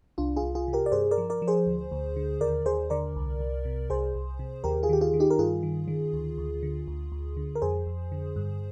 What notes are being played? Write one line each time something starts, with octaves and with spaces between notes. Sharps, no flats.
C2 D4 F4
F4 G#4
C2
F4 G#4
C3
G4 A#4
D5
G2 G#4 C5
A#4 D5
F3
A#4 D5
F3
G#4 C5
D2
D2
D3
D#2 A#4 D5
D#2 G#4 C5
D3 A#4 D5
C2
C2
C3
C2 G#4 C5
C2
C3
D#2 G4 A#4
F4 G#4
D#3 G4
F4 G#4
D#3
D#4 G4
A#4
G2 F4 G#4
D#3
D#3
D2
D2
D3
D2
D2
D3
A#4
F2 G#4 C5
F2
D3
G2